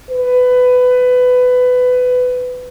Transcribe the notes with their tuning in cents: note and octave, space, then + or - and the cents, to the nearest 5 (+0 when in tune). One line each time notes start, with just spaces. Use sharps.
B4 +20